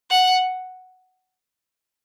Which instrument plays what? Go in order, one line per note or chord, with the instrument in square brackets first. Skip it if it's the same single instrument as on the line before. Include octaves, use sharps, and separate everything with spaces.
[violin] F#5